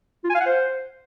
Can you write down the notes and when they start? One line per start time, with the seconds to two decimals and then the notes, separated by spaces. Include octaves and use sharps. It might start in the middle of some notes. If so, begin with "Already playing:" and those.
0.24 F4
0.29 G#5
0.35 F5
0.40 F#5
0.46 C5